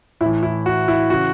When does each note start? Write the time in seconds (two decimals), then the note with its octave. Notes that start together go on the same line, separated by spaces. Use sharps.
0.21 A2 E4
0.26 E3
0.43 E4
0.66 F#4
0.88 E4
1.10 C#3 E3 F#4